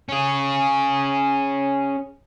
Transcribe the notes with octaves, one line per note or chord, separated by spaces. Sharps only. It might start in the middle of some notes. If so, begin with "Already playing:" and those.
C#4 G#4